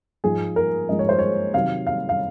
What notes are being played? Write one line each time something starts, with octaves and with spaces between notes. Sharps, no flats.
G#2 F3 G#3 G#4
A#4
G#2 F3 G#3 D#5
C#5
C5
C#5
C3 D#3 F#3 F5
F5
F5